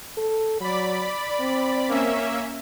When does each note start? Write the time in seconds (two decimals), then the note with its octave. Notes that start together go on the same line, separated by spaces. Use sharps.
0.17 A4
0.61 F#3 D5 B5
1.40 C4
1.88 A#3 C#4 E5